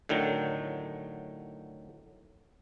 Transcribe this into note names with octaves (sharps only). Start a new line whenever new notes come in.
A2 D3 D#3 F#3